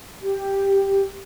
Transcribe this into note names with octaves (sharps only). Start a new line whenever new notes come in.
G4